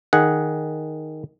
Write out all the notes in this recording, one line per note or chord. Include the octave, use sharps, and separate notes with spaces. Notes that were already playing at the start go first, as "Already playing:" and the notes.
D#3 G#4 F#5